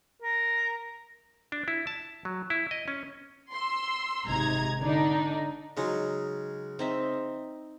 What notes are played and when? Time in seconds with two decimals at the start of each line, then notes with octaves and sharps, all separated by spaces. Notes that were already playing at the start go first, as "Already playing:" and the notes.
0.22 A#4
1.52 D4
1.68 E4
1.87 A5
2.25 F#3
2.50 E4
2.71 D#5
2.88 C#4
3.53 C6 E6
4.26 G#1 C3 D#4 A#5 G#6
4.80 D3 D4 D#4
5.77 C#3 F#3 G#3 D#4
6.79 C4 D#4 E5